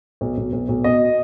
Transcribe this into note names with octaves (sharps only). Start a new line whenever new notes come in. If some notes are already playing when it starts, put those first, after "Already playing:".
B1
B1
B1
B1
B2 D#5